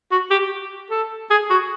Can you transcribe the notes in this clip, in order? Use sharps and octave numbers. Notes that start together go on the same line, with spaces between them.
F#4
G4
A4
G#4
F#4